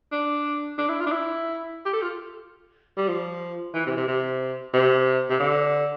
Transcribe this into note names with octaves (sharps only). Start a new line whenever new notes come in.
D4
D4
E4
F4
D4
E4
G4
A4
F4
G3
F3
E3
C3
C3
C3
C3
C3
D3